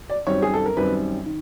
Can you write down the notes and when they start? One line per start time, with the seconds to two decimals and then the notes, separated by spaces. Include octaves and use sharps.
0.10 D5
0.27 F#2 D#3 G3 C4 C#5
0.42 G#4
0.54 A4
0.66 A#4
0.76 F#2 D#3 G3 C4 B4
1.26 D#3